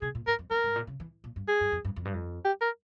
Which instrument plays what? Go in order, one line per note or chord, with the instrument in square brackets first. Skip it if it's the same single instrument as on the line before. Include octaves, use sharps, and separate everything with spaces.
[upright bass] C3 [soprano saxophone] G#4
[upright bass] A#2
[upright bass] G#2 [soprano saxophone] A#4
[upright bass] F2
[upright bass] E2 [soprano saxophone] A#4
[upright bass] G#2
A#2
C#3
E3
A#2
G2
[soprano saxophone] G#4
[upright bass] G2
F2
G2
F2
G2
F2
[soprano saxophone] G4
A#4